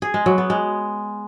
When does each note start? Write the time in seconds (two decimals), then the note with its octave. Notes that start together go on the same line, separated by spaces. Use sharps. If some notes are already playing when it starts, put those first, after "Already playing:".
0.02 G#4
0.14 G#3
0.26 F#3
0.38 B3
0.50 G#3